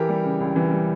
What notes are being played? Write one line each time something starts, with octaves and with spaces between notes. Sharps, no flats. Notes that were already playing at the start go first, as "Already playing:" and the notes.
Already playing: E3 G4 A#4
G3
C#3
C#2
E3
G3